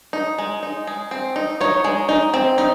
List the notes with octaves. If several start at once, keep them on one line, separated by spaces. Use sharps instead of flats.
D#4
G#3
D#4
G#3
C4
D#4
D#4 C#5
G#3
D#4
C4
D#4